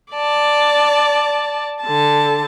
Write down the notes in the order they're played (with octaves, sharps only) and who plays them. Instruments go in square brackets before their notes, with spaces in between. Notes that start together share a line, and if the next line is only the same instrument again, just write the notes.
[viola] D5 A5
D3 A5